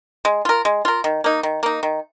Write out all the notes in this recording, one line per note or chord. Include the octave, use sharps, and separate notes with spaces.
G#3
F4 A#4
G#3
F4 A#4
D#3
A#3 D#4
D#3
A#3 D#4
D#3